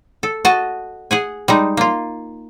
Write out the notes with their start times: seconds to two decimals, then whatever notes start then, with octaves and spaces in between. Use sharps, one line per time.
0.23 A4
0.45 F#4 D#5 A5
1.11 G#4 F#5 G#5
1.48 G3 G#3 D#4
1.77 A#3 F4